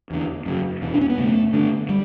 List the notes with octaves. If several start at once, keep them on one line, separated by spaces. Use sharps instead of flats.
E2 D3
F#2 C#3
E2 B2
D4
C#4
B3
F#2 C#3 A3
G2 D3
G3